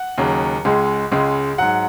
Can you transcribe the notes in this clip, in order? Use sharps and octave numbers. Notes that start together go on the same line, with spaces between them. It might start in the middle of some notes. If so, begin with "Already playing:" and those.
Already playing: F#5
D#2 C#3 F#3
C#2 C#3 G#3
C#2 C#3 G#3
G#2 F#3 F#5